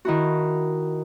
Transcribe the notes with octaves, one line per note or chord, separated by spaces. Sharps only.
D#3 E4 F#4